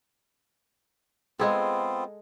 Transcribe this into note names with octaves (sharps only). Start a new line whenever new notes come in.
G#3 B3 C4 F4 G#4 A4